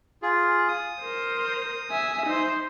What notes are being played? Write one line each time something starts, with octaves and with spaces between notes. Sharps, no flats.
F4 G#4
D#6
A#4 C5
E5 G#5
D#4 C5